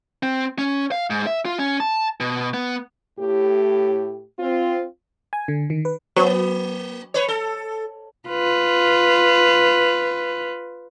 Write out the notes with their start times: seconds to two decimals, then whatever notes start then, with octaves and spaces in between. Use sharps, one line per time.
0.23 C4
0.58 C#4
0.92 F5
1.10 G#2
1.27 E5
1.45 F4
1.59 C#4
1.80 A5
2.20 B2
2.54 B3
3.19 A2 G4
4.40 C4 F4
5.33 G#5
5.48 D3
5.70 D#3
5.85 B4
6.16 F#3 A#3
7.14 B4 C#5
7.28 A4
8.29 F4 B4